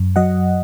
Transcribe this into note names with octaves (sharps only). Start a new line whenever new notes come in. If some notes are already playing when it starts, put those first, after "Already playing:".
Already playing: F#2
F#3 D#5 F#5